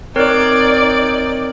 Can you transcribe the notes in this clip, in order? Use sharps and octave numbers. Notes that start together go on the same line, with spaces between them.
C4 D#4 A#4 C#5 D5